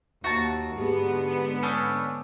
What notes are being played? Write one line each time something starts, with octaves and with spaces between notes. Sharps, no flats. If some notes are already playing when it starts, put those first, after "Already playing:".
D#2 F#4 E5 A5 A#5
G#2 D3 B3 G4 G#4
C#4 D4 D#6 E6 G6